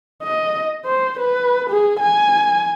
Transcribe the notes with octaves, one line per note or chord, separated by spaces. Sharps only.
D#5
C5
B4
G#4
G#5